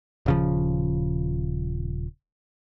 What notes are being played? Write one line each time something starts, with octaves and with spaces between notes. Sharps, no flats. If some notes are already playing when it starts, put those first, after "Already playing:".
D#1 C#3 F3